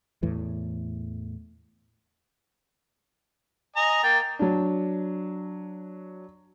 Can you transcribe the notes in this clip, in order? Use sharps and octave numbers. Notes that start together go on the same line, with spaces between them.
E2 A2 E3
D#5 G#5 A#5
A#3 G5 A6
F#3 D4